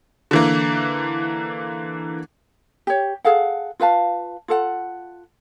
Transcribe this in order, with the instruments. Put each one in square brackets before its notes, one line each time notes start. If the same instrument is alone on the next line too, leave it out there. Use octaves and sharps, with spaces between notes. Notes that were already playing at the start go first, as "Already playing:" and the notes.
[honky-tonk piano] D3 E3 A#3
[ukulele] G4 C#5
G#4 A4 F5 F#5
F4 B4 F5 A5
F4 A4 F#5